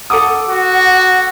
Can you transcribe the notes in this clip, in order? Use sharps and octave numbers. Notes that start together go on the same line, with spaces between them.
A4 F#5 D6 D#6
F#4